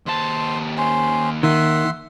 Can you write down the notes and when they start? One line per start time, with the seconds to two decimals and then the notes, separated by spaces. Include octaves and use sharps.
0.07 D#2 C5 A5
0.78 C#4 C5
1.43 D#3 E5 F#5 C6